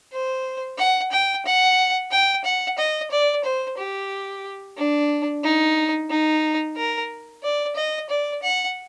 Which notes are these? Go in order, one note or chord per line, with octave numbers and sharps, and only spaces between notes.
C5
F#5
G5
F#5
G5
F#5
D#5
D5
C5
G4
D4
D#4
D#4
A#4
D5
D#5
D5
F#5